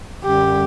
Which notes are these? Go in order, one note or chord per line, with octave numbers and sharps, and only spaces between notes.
F#2 D3 G3 G4